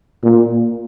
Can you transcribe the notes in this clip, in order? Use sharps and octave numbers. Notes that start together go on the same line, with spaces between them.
A#2